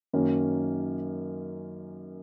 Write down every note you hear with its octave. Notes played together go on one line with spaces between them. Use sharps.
F#2 D#3 A#3 C#4